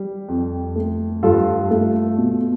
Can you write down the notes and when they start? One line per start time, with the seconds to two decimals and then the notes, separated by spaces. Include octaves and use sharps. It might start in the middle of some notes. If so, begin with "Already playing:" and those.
Already playing: G3
0.28 F2
0.76 A3
1.23 G2 F4 A4
1.70 A3
2.18 B2